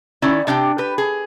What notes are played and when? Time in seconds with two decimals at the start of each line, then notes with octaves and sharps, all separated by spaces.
0.22 D#3 C#4 E4 D5
0.47 C3 D4 G4 G5
0.78 G4 B4
0.98 G#4